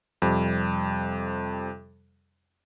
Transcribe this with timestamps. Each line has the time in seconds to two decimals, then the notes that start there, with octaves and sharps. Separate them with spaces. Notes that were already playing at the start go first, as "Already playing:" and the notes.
0.22 F2 C3 G3